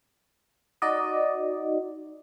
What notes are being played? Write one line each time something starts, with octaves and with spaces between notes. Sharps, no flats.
D#4 F#4 D5 D#5